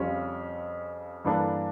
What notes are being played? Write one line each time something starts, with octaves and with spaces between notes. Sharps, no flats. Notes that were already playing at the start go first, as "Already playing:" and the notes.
Already playing: F2 C#3 G3 C#4 F4
G2 E3 A#3 D4 A4